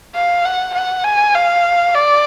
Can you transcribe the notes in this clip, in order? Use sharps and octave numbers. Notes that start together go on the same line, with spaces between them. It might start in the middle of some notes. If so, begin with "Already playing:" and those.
F5
F#5
F#5
G#5
F5
D5